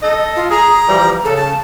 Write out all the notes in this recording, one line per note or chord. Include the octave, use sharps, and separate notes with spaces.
A4 D#5
F4
G#4 A#5
E3 F3 G3
C#3 A4
A5